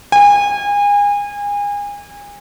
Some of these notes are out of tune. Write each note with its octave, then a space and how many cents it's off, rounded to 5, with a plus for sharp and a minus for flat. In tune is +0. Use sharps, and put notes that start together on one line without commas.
G#5 -30